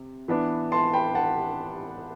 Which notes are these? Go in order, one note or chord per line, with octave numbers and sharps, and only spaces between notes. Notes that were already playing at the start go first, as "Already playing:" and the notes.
Already playing: C3
E3 B3 D4
A5 C6
G5 B5
F#5 A5